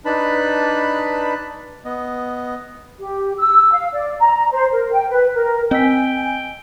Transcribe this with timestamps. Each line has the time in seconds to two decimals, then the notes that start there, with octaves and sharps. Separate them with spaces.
0.05 D4 D#4 B4 A5 B5
1.85 B3 D#5
2.99 G4
3.38 E6
3.73 F5
3.93 D5
4.20 A#5
4.53 C5
4.73 A#4
4.93 G5
5.09 B4
5.34 A#4
5.71 C4 D#5 G5 G#5 E6 B6